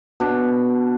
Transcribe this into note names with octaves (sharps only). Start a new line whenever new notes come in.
B2 D4